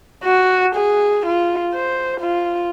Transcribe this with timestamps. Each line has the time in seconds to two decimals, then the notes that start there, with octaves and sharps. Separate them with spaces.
0.24 F#4
0.75 G#4
1.26 F4
1.75 C5
2.21 F4